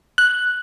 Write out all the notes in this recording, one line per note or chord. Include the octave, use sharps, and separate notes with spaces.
F#6